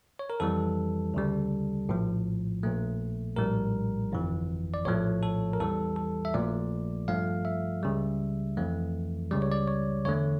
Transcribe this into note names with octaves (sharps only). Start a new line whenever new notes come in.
C#5
A#4
F2 E3 G3 A4
D2 C#3 G3
A#1 A2 F3
A#1 A#2 A3
A#1 A2 G3 A#4
G1 F2 E3
D5
A#1 A2 F3 A3 C#5
A4
A#4
E2 E3 G3 A4
A4
E5
A#1 A#2 F3 A3 D5
G2 F3 A3 F5
E5
C#2 C#3 G3
F2 E3 A3
C#2 C#3 G3 D5
C#5
D5
C#5
E2 D3 A3 C#5